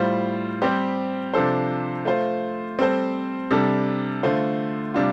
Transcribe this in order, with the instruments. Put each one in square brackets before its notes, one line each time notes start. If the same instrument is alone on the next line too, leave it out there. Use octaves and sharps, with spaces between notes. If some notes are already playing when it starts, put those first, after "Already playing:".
Already playing: [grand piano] A2 G3 F4 C5
G3 C4 G4 C5
C3 F3 D4 A4 C5
A3 F4 C5
G3 C4 A4 C5
C3 G3 D4 A4
D3 A3 F4 C5
C3 G3 D4 F4